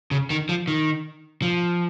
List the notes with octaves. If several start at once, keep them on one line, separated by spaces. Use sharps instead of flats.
C#3
D#3
F3
D#3
F3